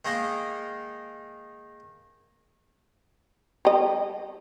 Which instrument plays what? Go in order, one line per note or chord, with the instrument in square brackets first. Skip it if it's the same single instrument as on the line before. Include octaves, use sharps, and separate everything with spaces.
[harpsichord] D#3 G#3 A#3 D#4
[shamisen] G3 D#5